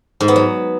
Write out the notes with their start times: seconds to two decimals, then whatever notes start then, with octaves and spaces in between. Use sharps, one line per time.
0.20 G#2
0.28 B3
0.36 F#3